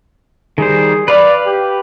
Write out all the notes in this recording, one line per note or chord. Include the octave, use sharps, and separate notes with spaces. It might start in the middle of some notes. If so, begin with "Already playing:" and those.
D#3 G3 G#4 C5
B4 D5 F5 B5
G4